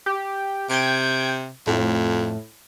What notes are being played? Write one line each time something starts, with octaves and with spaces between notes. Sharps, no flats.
G4
C3 G5 G#6 D7
F2 A2